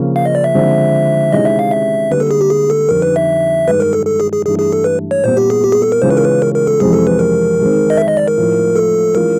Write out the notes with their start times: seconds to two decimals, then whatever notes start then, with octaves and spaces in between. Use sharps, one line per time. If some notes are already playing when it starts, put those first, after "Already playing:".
Already playing: C#3 F3 A#3 C#4
0.16 F5
0.25 D#5
0.35 D5
0.44 E5
0.54 D3 F3 G#3 C4
1.32 C3 D#3 G#3 C#4 E4 D#5
1.45 E5
1.59 F5
1.71 E5
2.10 D3 G3 A#3 B4
2.20 A4
2.31 G#4
2.41 G4
2.50 G#4
2.70 A4
2.89 F2 D3 G3 C4 D#4 A#4
3.02 B4
3.16 E5
3.68 G2 D#3 G#3 B4
3.80 A#4
3.93 A4
4.07 A4
4.20 G#4
4.32 G#4
4.46 G2 E3 A3 D4 G#4
4.59 G#4
4.72 A4
4.84 B4
5.11 C#5
5.24 A#2 G3 B3 C5
5.37 G4
5.50 G#4
5.64 G4
5.72 G#4
5.82 A4
5.92 A#4
6.02 C#3 E3 G#3 C#4 F4 C5
6.10 B4
6.17 A#4
6.24 B4
6.42 A#4
6.55 A#4
6.67 A4
6.80 F2 C3 E3 G#3 C4 G#4
6.93 A4
7.07 B4
7.19 A#4
7.59 D#3 G#3 C4
7.90 D#5
7.97 E5
8.08 D#5
8.17 D5
8.28 A#4
8.37 A2 F3 A3
8.76 A4
9.15 E3 G#3 C#4 F4 A#4